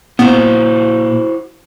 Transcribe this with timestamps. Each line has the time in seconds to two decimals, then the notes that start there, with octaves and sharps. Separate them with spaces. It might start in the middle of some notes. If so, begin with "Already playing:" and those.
0.19 A#2 B3 E4 F#4 C5